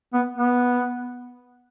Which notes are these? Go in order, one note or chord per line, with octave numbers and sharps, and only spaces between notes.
B3
B3